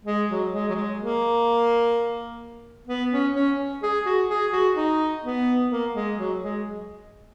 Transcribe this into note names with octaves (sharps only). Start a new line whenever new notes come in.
G#3
F#3
G#3
F#3
G#3
A#3
B3
C#4
C#4
G#4
F#4
G#4
F#4
D#4
B3
A#3
G#3
F#3
G#3